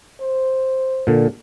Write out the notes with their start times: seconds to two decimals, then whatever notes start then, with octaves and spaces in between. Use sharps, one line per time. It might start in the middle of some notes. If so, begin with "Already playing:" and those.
0.21 C5
1.07 A#2 D3